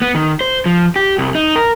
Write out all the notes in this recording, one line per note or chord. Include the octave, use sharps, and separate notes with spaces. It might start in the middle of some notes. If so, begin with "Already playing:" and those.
B3
D#3
C5
F3
G4
C2
D#4
A#4